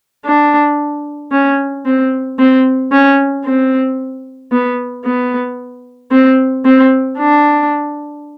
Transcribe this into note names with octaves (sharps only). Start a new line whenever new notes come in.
D4
C#4
C4
C4
C#4
C4
B3
B3
C4
C4
D4